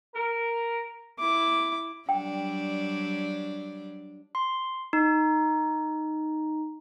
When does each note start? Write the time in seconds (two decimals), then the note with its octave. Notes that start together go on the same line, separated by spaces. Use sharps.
0.15 A#4
1.20 E4 D6
2.09 F#3 G3 D4 G5
4.35 C6
4.93 D#4